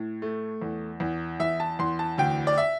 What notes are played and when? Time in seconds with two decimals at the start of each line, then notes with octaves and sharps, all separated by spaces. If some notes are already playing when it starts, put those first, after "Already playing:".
Already playing: A2
0.22 A3
0.62 E2
1.00 E2
1.40 E2 E5
1.60 A5
1.79 E2 C6
1.99 A5
2.18 D2 G5
2.47 D5
2.58 E5